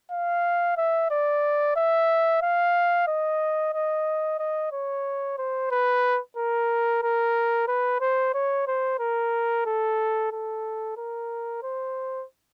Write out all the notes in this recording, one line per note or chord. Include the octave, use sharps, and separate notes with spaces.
F5
E5
D5
E5
F5
D#5
D#5
D#5
C#5
C5
B4
A#4
A#4
B4
C5
C#5
C5
A#4
A4
A4
A#4
C5